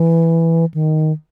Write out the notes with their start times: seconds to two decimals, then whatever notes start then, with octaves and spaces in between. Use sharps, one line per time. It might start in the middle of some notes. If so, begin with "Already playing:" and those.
Already playing: E3
0.74 D#3